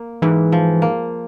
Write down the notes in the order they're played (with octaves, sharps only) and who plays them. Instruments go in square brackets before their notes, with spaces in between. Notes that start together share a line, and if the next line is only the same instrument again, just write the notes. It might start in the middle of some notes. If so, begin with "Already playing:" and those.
Already playing: [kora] A#3
[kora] G#2 [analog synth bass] E3
[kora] F3
A#3